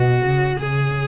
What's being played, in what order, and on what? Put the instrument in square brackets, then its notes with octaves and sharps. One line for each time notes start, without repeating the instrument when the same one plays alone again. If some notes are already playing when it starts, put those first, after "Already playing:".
Already playing: [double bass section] B2 [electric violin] F#4
[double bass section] C#3
[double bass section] C#3 [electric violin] G#4